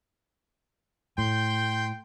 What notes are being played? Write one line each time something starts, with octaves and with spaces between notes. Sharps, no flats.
A2 G5 C6 G6